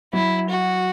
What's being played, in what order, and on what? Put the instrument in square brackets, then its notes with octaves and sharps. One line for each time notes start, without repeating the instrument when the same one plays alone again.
[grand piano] F#3 [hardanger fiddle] E4
[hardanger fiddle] F#4